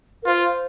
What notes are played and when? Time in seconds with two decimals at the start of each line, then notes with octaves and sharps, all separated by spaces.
0.23 A#4
0.26 F4 C5